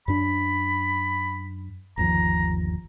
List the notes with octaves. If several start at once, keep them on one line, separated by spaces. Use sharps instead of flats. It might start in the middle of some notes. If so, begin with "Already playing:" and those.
F#2 D4 B5
G1 D#2 F3 A#5